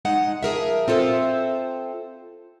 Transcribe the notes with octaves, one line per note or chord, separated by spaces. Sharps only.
G#3 D#4 F#5
F3 G#4 A#4 E5
C4 F4 A4 C5 E5